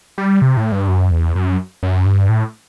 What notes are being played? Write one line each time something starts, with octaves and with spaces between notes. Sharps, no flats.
G3
C3
A2
G2
F#2
E2
F#2
F#2
G2
A2